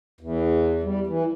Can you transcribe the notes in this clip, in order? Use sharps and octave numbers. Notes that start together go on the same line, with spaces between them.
E2
G3
E3